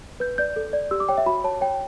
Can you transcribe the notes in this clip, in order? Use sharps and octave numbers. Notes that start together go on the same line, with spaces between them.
B4 G6
D5 G6
A4
D5
G4 E6
D6
C#5 G5
E5
F#4 B5
C#5 A5
C#5 G5